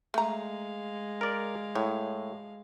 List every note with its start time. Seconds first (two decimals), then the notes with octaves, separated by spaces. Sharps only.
0.14 G#3 A3 F5 A#5
1.21 A#4 D5
1.75 A2 C#5